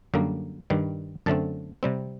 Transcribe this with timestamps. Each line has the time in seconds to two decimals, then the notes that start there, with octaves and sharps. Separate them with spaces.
0.14 F#2 D3 G3 A#3
0.70 G2 D#3 G3
1.26 F#2 D3 A3 C4 A5
1.83 C3 G3 C4